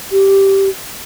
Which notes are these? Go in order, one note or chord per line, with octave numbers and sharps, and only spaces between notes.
G4